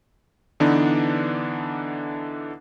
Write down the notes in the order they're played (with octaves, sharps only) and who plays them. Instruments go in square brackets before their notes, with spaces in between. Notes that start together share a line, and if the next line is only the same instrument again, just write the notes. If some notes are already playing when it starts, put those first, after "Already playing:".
[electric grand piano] D3 E3 B3 D4 D#4